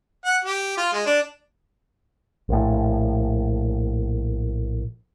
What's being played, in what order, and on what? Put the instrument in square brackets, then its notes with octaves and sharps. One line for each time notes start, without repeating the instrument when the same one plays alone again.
[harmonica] F#5
G4
F4
G#3
D4
[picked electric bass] A#1 A2